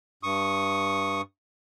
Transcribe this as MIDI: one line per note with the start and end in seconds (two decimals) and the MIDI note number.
0.23 1.21 43
0.23 1.21 85
0.23 1.21 87